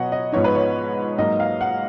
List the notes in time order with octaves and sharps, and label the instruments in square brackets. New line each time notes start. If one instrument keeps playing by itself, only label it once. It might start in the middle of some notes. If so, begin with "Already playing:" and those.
Already playing: [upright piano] B2 F#3 B3 C#5 D#5 F#5
D#5
G#2 F3 B3 D#4 C#5
B4
C#5
G#2 F#3 A#3 D#4 D#5
F5
F#5